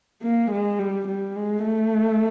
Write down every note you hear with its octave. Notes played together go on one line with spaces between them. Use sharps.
A#3
G#3
G3
G3
G#3
A3